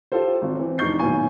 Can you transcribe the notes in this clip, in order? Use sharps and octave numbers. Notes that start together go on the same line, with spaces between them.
F4 G4 A4 C5
G#1
E3 C4
F1 D4 D#4 C#6 G6 C7
B1 A2 D#3 A#3 G#5 C#6